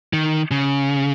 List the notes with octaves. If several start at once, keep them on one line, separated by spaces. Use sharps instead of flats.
D#3
C#3